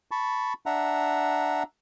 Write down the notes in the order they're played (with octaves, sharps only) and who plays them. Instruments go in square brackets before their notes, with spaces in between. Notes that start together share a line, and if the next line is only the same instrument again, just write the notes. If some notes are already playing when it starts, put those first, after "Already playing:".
[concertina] A5 B5 C#6
D4 E5 F#5 A#5